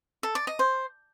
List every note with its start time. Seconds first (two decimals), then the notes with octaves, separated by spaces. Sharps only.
0.23 A4
0.35 D5
0.47 D#5
0.59 C5